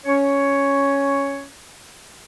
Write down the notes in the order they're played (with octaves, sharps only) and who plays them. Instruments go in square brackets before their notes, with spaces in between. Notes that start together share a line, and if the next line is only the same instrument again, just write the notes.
[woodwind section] C#4 C#5